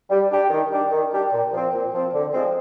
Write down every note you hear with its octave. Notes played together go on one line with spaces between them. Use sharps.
G3
D4 G4
D#3
G3 D4 G4
D#3
G3 D4 G4
A#2
F3 C4
A#2
F3 C4
D3
F3 G#3 C4